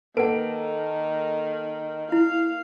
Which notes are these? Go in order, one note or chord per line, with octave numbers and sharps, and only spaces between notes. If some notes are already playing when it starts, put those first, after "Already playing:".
D#3 A#3 A4 B4 F#5 D7
E4 F5